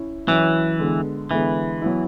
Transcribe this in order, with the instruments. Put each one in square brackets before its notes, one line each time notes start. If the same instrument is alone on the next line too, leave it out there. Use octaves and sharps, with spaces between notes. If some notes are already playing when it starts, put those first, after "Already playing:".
Already playing: [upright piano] C#4 E4
[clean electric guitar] E3 [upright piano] F#3 C#4 E4
[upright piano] D3 G#3 B3
[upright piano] D3 G#3 B3 [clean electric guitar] E3
[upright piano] F#3 B3 E4